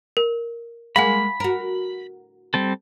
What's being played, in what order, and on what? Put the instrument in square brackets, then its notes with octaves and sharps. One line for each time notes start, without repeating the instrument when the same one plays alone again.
[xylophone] A#4
[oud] G#3 A#3 [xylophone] F5 F#5 G#5 [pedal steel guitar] B5
[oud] F#4 A#4
[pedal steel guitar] G3 C4 A4